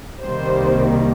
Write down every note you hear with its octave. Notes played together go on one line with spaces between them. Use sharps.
C2 C3 D#3 G3 A#3 C5